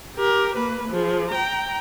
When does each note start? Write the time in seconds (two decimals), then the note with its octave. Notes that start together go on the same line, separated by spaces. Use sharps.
0.16 G4 A#4
0.56 A#3 B4
0.89 F3 G#4
1.31 G5 A#5